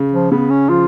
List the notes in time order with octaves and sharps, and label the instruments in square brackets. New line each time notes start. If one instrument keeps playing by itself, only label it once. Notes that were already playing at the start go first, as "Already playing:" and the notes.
Already playing: [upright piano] C#3
[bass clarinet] F3
[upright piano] C#3 [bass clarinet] B3
[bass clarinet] C#4
[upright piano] F3 [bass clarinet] F4